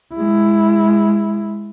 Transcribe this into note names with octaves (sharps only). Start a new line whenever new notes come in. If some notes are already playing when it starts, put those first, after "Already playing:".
G#3 E4